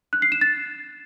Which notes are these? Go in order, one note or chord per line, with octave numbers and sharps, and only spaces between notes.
F#6
C7
E7
A6